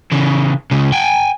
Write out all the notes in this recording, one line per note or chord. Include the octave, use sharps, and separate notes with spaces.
C#3 E3
C#2 C#3
G5 G#5